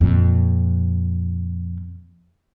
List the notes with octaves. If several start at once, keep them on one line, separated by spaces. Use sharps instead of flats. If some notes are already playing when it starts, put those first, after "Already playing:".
F2 A#2